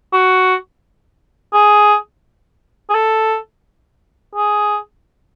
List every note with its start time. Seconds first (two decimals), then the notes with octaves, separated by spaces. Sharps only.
0.13 F#4
1.54 G#4
2.90 G#4
2.95 A4
4.36 G#4